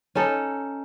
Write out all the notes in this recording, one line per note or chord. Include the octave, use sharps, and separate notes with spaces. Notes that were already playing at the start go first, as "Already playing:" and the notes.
C#4 D#4 A4